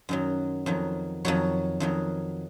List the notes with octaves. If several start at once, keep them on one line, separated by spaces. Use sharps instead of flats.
F#2 D#3 F#3
F2 D#3 F#3
F2 D#3 F#3 C#5
F2 D#3 F#3